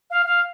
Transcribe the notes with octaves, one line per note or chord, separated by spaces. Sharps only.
F5
F5